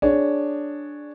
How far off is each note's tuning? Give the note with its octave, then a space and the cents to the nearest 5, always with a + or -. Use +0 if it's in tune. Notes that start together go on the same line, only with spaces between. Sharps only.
D4 +0 G#4 +0 C#5 +0